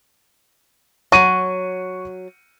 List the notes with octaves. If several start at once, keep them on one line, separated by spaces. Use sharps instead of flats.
F#3 C#6 D#7